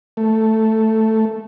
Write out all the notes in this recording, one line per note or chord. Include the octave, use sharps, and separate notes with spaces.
A3